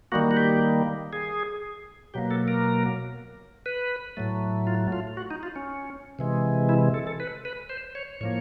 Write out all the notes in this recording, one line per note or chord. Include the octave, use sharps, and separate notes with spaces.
D#3 G3 A#3 F#4
F#4
G4
G#4
B2 F#3 A#3 G4
A4
A#4
B4
A2 F#3 A3
F4
F4
F#4
D#4
F4
C#4
C3 E3 G#3
E4
A4
A4
B4
B4
C5
C#5
A2 F3 A#3 C#5